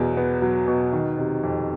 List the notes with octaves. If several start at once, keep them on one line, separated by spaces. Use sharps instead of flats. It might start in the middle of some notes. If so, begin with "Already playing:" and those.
Already playing: E2 B2 F#3
B3
F#3
B2
D#3
C3
F2